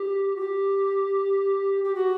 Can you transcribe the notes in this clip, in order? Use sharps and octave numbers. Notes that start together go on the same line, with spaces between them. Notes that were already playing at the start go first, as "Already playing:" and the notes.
Already playing: G4
F#4
G4
G4
F#4